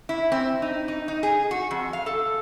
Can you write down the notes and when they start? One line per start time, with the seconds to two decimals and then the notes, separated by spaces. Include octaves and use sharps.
0.09 E4
0.32 C4
0.62 D#4
0.88 D#4
1.08 D#4
1.23 G#4
1.51 F#4
1.71 F2
1.93 F5
2.06 A4